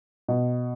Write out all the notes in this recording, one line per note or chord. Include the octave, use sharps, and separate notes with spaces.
B2